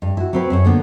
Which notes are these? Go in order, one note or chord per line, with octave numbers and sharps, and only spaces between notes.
G2
E4 F#4
F#3 C4 B4
F#2 C5 C#5
D3 A#3 B3